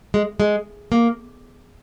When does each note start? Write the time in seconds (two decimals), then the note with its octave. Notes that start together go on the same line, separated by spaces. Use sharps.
0.14 G#3
0.40 G#3
0.92 A#3